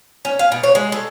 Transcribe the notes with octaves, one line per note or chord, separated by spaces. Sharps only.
C#4
F5
B2
C#5
G#3
A4